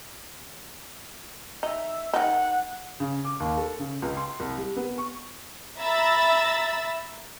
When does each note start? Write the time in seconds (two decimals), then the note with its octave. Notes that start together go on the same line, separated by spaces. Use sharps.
1.63 D#4 E5
2.13 D#3 D#4 F#5
3.00 C#3
3.25 D6
3.40 D#2
3.57 A4
3.79 C#3
4.02 C#2
4.17 C6
4.40 C2
4.58 G3
4.77 B3
4.98 C#6
5.79 E5 A#5 B5 E6 A6